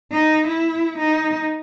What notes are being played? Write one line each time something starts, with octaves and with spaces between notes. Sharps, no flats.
D#4
E4
D#4